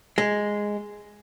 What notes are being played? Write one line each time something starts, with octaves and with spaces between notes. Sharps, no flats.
G#3